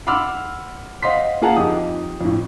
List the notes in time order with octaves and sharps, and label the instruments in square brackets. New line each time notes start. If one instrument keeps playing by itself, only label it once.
[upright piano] F#5 B5 C6 D6 E6 F6
C5 D#5 F5 F#5 C6 B6
A#3 F4 G#4 F#5 A5 A#5
F2 D#4 G4 D#6
F2 A2